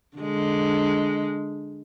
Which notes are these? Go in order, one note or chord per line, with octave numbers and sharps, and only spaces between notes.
D3 G#3